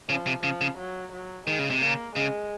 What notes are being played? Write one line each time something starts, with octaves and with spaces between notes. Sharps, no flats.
C#3 F3
C3
C#3 F3
C#3
F#3
F#3
D#3 G#3
C#3
C3
C#3 A#3
C#3 G#3